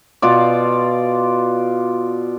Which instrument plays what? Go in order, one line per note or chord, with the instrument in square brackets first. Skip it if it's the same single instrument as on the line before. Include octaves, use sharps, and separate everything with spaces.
[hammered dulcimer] B2 F4 D5